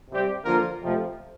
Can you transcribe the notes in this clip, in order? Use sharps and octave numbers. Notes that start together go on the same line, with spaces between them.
C3 G3 C4 G4
D3 F3 A#3 F4 A#4
F2 C3 F3 A3